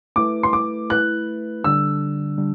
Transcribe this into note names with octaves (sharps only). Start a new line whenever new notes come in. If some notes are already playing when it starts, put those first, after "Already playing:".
A3 E4 B4 D6
C6
D6
A3 E4 B4 F#6
D3 G3 D4 E6
D3 G3 D4